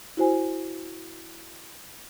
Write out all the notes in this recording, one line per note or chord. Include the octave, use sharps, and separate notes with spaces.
E4 F#4 C5 G#5